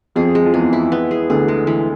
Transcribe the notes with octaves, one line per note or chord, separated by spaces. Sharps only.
F2 F3 G#4
G#3
F3
E2 E3 G#4
E4
B3
G#4
D2 D3 G#4
G#3
E3